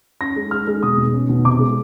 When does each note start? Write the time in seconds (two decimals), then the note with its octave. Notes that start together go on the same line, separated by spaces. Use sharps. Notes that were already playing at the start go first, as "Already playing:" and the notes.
0.21 C#4 A#6
0.36 G#3
0.51 G#3 F6
0.67 G#3
0.83 B2 D#6
0.98 B2
1.13 C#4
1.29 B2
1.45 C3 D6
1.59 G#3